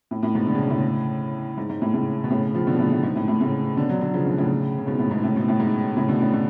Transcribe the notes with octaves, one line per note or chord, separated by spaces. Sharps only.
A2
A2
G#2 B2
D3
C#3
B2
A2 C#3
G#2
G#2
A2
A2 C#3
B2
A2 C#3
C#3 F3
B2 D3
A2 C#3
A2
G#2
A2
A2
A2 C#3
B2 D3
D3 F#3
D3 F#3
C#3 F3
B2 D3
A2 C#3
C#3
G#2 B2
A2
G#2 B2
A2 C#3
G#2 B2
A2
G#2
A2 C#3
B2 D3
A2 C#3
B2 D3